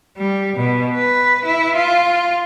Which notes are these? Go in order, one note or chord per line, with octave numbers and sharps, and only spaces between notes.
G3
B2
B4
E4
F4